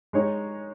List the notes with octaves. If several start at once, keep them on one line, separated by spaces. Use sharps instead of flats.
G#3 D#4 C#5